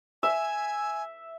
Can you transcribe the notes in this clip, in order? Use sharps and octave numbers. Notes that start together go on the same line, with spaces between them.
E5 G#5